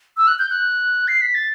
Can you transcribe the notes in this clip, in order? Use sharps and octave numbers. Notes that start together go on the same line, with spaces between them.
E6
F#6
G6
F#6
C7
B6
A6